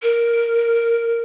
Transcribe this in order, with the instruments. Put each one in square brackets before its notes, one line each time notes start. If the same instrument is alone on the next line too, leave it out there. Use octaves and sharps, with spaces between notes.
[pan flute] A#4